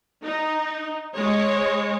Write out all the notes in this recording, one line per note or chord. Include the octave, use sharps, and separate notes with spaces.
D#4
G#3 C#5